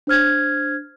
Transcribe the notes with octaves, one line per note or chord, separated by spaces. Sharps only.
D4 C5 F6 G#6